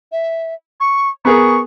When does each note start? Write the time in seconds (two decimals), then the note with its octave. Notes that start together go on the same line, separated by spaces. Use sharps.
0.12 E5
0.80 C#6
1.25 B3 G#4 A#4 C#6